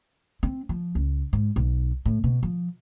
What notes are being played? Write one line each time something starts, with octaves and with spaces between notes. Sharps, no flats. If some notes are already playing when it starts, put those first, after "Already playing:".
C4
F3
C#2
G#2
B1
A2
B2
F3